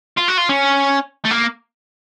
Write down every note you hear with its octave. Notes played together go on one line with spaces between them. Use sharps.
F4
F#4
F4
C#4
A3
A#3